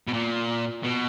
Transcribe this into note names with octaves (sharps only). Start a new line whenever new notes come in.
B2
A#2
B2